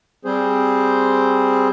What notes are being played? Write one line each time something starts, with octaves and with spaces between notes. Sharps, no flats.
G3 C4 G#4 C5